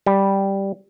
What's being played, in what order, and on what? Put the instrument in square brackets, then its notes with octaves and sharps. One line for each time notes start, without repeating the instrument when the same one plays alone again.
[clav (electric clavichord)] G3